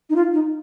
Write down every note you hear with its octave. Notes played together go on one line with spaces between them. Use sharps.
D#4
F4
D#4